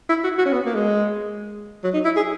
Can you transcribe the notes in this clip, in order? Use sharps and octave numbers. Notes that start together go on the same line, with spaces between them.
E4
F#4
F#4
C#4
B3
A#3
G#3
F#3
D#4
E4
G#4